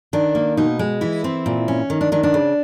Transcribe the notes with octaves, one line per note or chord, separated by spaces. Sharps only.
D#3 D4
A#3
B2 D#4
G#3
E3 E4
C4
A#2
C#4
D#3
D4
D#3 D4
D4
C#3